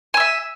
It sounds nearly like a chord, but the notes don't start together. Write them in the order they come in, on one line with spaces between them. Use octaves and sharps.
G#5 E6 E5